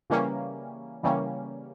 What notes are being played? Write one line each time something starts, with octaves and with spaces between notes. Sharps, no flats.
C#3 E3 G3 A#3 C#4
C#3 E3 G3 A#3 C#4